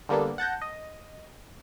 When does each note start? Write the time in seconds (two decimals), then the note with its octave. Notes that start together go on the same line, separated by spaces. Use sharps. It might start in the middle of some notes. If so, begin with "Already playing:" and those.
0.09 D3 G3 A#3 B3 D4 A4
0.38 F#5 A5 G6 A#6
0.62 D#5